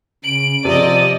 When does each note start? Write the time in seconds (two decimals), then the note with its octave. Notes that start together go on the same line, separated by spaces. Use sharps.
0.24 C#3 D7 F#7
0.65 C3 F3 D5 D#5 D#7